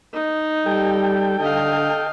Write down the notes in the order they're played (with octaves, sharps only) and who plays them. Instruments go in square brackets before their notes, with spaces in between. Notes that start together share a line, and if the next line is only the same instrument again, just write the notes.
[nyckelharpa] D#4
[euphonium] G3 [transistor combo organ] A4 G5
[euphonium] D3 [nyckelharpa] D#5 F5